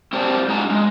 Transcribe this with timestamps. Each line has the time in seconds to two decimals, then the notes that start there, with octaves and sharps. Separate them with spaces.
0.13 C4 G4 A#4 C5 D5 A5
0.48 G#2 G#3 D4 F4 G#5 A#5
0.70 G#3